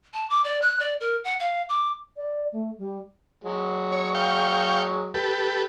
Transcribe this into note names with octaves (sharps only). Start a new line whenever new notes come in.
A5
D6
D5
F#6
D5
A#4
F#5
F5
D6
D5
A3
G3
F#3 G#3
C#5
F5 G5 C#6
G4 A4 B4